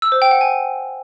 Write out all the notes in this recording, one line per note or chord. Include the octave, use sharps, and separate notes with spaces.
E6
C5
G5
F#5
G#5